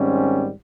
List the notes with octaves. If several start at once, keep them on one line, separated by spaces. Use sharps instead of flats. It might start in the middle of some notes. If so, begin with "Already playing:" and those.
Already playing: G#2 D#3 G3 C4 C#4